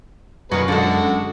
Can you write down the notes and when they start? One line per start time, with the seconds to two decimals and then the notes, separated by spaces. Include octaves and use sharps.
0.51 F#2 D#3 F#3 A#3 G#4 B4
0.68 D3 G#3 F#4 A4 F#5